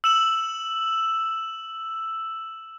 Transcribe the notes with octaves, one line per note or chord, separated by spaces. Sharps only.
E6 E7 F#7